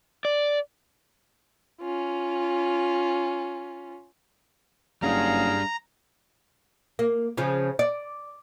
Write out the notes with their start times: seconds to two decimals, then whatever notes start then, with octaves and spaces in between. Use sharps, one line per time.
0.25 D5
1.81 C#4 F4
5.02 F#1 G3 D4 G#4 F5 A#5
6.99 A#3
7.37 C#3 F3
7.79 D5